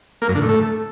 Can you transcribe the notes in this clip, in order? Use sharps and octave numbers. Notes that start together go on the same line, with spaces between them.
A#3
F#2
D3
A2
A3